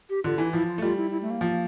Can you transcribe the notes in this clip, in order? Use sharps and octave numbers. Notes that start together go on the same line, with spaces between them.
G4
D3 F4
E3 E4
F3 E4
F4
A3
G3 F4
E4
E4
A3
A#3
F3